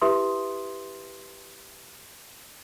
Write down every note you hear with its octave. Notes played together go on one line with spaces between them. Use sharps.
E4 G4 B4 E5 C6 D#6